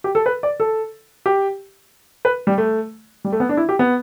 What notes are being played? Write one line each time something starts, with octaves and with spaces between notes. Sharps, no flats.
G4
A4
B4
D5
A4
G4
B4
G3
A3
G3
A3
B3
D4
E4
G4
B3